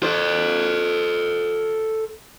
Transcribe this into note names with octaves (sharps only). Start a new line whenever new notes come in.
A4 C5